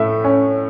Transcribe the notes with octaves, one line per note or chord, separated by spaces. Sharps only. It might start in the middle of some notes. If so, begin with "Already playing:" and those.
Already playing: A2 A3 E5
C#4